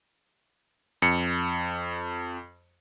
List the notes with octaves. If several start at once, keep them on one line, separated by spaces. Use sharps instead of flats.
F2 C#7